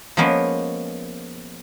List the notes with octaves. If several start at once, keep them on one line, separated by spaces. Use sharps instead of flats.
F3 G#3 A#3 B3 C#4